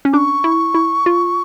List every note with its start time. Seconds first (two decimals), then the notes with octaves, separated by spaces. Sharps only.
0.05 C#4
0.13 D4 C#6 D6
0.44 E4
0.74 E4
1.06 F4